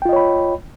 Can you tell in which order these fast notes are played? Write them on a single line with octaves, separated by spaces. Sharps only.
G5 F4 D#5 C#5 B5